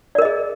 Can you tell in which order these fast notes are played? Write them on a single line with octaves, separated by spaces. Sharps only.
D5 A#4 D#5 G#4